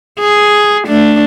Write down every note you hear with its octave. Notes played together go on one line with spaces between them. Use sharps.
G#4
A3 D4